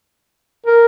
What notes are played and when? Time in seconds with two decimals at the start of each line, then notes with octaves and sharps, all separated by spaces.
0.66 A#4